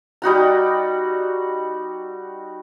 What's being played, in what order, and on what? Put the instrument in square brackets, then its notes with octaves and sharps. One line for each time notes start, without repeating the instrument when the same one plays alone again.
[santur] G3 D#4 F#4 A#5